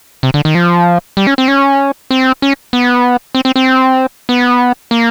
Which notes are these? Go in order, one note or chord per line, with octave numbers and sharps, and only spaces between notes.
C3
D3
D#3
F3
G3
C#4
C4
C#4
C4
C#4
B3
C4
C4
C4
B3
A#3